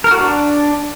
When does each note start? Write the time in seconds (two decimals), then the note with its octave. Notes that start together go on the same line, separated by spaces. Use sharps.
0.04 A#4
0.11 F#4
0.18 D4